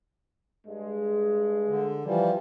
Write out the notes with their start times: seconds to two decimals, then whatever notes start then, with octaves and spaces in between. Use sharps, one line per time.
0.67 G2 G#3
1.68 D3
2.05 E3 F3 G3